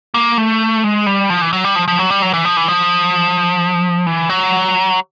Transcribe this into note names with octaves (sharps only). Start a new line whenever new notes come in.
A#3
A3
G#3
G3
F3
E3
F#3
G3
F3
F3
F#3
G3
F#3
E3
F3
E3
F3
E3
F#3